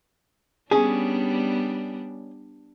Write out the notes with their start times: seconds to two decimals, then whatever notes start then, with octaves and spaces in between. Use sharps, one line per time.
0.71 G3 B3 C#4 D4 G#4